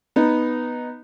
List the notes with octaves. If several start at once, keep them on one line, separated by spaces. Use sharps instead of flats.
B3 D#4